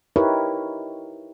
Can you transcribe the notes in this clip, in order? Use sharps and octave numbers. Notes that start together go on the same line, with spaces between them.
D#4 E4 G4 A#4 B4 C#5